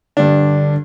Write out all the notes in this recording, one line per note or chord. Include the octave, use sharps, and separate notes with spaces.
G2 D3 D4